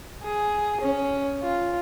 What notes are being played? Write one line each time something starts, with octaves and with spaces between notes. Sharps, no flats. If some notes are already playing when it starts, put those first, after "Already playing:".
G#4
C#4
F4